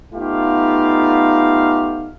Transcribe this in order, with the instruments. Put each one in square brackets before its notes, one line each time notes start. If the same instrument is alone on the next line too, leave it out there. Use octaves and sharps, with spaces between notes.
[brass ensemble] A3 B3 D#4 F4 G4 F5